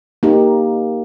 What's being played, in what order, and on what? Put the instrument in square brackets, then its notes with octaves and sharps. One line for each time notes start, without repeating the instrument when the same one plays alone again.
[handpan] A#3 D#4 G4